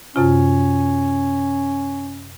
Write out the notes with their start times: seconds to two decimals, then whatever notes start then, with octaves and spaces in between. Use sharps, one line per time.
0.16 F#2 C3 C#4 F4